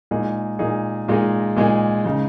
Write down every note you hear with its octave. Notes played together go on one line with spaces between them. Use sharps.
A#2 G#3 D#4 G#4
A#2 G#3 D#4 G#4
A#2 G#3 D#4 G#4
A#2 G#3 D#4 G#4
C#3 G#3 D#4